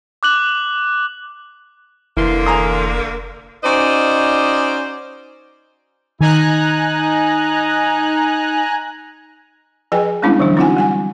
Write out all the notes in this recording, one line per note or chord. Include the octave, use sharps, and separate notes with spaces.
D6 F#6 F#7
F1 D3 E3 A#3 C6
G#5 A#5 D#6
C#4 D#4 F#4 C5 D5 D#5
D#3 D#4 G#5 A#5 F#6
F3 G#4 B4 D#5 G5 G#5
G3 G#3 B3 C#4 D4 E4
D3 E3 F#3 D4
C4 D#4 E4 F#4 F#5 G#5
G3 F#5 G#5